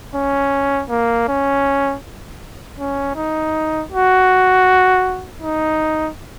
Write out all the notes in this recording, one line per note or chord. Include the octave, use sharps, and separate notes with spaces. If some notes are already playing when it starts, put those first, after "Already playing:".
C#4
A#3
C#4
C#4
D#4
F#4
D#4